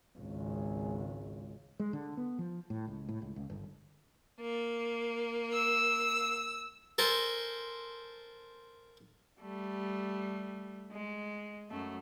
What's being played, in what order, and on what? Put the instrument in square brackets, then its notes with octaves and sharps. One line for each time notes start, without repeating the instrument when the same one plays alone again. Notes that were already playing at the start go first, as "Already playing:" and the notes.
[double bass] G#1 C#2
[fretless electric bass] G#3
D3
B3
F3
A2
C#2
A2
C#2
C#2
G1
[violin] A#3
[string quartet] E6
[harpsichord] A4 A#4 C5 G#5 A5
[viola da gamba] G3 A3
G#3
F#2 F#3 A3